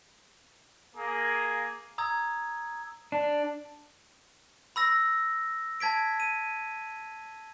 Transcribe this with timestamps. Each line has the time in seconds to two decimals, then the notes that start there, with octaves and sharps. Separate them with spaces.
0.95 A#3 G#4
1.98 A#5 D#6 E6 G#6
3.12 D4
4.76 B5 E6 A#6
5.80 A5 G#6 B6 D7
6.20 D#7